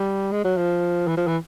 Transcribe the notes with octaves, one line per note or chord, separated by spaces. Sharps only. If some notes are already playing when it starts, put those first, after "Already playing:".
Already playing: G3
G#3
F#3
F3
E3
F3
E3